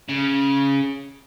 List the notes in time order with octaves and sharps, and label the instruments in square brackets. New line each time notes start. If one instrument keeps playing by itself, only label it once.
[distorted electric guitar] C#3